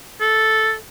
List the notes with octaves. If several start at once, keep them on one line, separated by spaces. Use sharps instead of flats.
A4